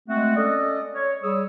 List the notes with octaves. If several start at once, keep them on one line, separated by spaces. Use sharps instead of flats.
G#3 A3 C4 F#4
C#4 A4 D5 D#5
C#5
G3 G#4 C#5 D#6 E6